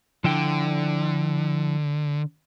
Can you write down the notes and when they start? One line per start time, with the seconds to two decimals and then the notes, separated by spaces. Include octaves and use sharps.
0.24 D3 F3 E4 G5